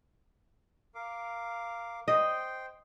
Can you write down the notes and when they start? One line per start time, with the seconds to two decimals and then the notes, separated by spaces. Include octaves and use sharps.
0.95 A#4 F5 D6
2.08 C5 D#5 G5